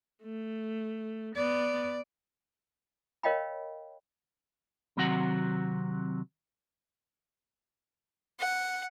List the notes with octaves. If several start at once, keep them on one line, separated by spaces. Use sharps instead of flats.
A3
B3 D5
A#4 C#5 D#5 F5 G5 B5
C3 D#3 F#3 C4 F#4 F#5
F#5